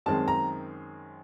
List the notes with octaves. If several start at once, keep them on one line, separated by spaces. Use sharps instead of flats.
F#2 D#3 G#3 C4 A5
A#5